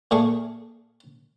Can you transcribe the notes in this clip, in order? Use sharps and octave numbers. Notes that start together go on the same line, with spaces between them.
A#2 A3 G#4 C#6